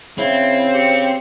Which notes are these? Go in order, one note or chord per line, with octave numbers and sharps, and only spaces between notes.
C#3 C4 E4
G4 C#7